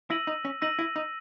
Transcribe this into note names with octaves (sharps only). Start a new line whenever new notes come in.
E4 E6 A#6 D#7 F#7
D#4
C#4
D#4 E6 A#6 D#7 F#7
E4
D#4